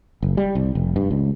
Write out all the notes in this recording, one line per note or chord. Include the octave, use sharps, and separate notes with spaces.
F#1
G3
C2
F1
G2
C#2